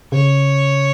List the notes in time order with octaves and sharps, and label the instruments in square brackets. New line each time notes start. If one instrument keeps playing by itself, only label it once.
[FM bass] C#3 [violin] C#5